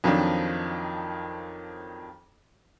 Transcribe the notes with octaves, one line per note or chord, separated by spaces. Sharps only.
F2 D#3 F3 F#3 C4 D4